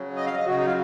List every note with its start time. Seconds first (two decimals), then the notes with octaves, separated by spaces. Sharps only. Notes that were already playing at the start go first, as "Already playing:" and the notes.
Already playing: C#3 F#3
0.16 D#5
0.26 F5
0.36 D#5
0.46 C#3 F#3 F#4
0.57 D#4
0.66 F4